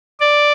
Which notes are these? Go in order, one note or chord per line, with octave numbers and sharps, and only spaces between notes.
D5